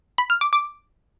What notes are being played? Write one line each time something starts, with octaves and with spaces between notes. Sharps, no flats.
B5
F6
D6
D6